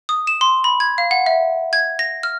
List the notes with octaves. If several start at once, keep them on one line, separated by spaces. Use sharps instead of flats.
D#6
E7
C6
B5
G#6
F5
F#5
E5
G#6
A#6
F6